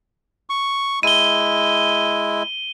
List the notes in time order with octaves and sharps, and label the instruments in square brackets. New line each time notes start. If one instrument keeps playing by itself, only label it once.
[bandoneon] C#6
[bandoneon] G#3 E4 [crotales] D#7 G7